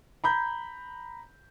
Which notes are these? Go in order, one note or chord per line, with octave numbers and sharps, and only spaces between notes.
A#5 B5 G6